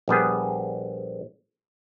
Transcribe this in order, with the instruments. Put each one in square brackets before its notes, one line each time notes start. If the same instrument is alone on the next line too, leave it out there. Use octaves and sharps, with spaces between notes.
[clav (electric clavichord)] A#1 G3 B3 G#4